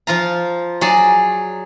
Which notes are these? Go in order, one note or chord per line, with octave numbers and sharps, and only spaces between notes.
F3 F4 A#5
F#3 F#4 G#4 D5